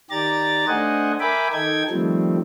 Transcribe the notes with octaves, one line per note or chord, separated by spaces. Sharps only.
D#3 G4 D5 A#5 A6
A3 D4 C5 D#5 F#5 G#5
A#4 E5 G5 G#5 B5 D6
D#3 D#4 A4 G5 G#6
D#3 F3 G3 A3 C4